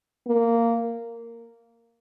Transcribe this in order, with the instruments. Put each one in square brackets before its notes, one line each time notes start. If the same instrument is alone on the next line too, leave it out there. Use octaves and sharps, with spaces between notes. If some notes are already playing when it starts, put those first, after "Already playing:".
[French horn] A#3